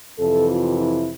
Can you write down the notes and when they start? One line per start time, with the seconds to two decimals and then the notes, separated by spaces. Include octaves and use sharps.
0.18 F2 C3 E3 A4
0.49 F4
0.79 E4